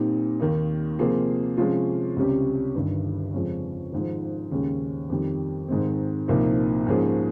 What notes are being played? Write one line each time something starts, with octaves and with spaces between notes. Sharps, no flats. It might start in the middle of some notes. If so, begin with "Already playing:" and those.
Already playing: A#2 G3 C4 D#4 G4
D#2 D#3 A#3 D#4
C3 F3 A#3 F4 G#4
C3 F3 G#3 C#4 F4
C#2 C3 G3 C#4 G4
G1 G2 D#3
F2 C#3 F3 G#3 C#4
G#1 G#2 F3
D#2 C#3 G#3 C#4
F2 D#3 G3
G#2 D#3 G#3 C4
C2 A#2 F3 A#3 D#4
G#2 F3 A#3 C#4 G#4